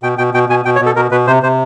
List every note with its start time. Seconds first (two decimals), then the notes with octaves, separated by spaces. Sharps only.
0.03 B2 G5
0.18 B2 G5
0.34 B2 G5
0.49 B2 G#5
0.65 B2 G5
0.76 C#5
0.81 B2 A4
0.96 B2 A#4
1.11 B2 B4
1.27 C3 C5
1.43 C3 C5